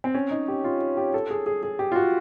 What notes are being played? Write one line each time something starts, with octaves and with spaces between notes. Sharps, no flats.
C4
C#4
D#4
G4
F4
G4
A4
G#4
G#4
G#4
G4
F4
F#4